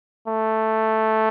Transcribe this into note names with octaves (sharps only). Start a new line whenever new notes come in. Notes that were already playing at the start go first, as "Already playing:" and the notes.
A3